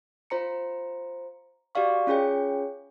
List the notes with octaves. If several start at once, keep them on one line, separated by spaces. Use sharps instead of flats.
F4 C5 A#5 C#7
F#4 G4 D5 F5 C#6
C#4 F4 G#4 C#5 G5